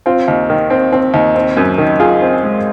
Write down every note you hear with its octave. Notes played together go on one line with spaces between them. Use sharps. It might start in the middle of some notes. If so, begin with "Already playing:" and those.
C4 F4
D#2
D#3
C4
C4
D#2
C4
F#2
D#3
D#3 F4 G#4
C4
G#3